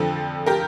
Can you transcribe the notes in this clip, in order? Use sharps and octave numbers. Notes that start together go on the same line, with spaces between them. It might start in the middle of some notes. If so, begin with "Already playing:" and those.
Already playing: F2 D3 F3 A4
G4 A#4